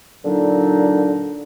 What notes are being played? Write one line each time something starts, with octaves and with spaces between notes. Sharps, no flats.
A#2 D3 F#3 D4 D#4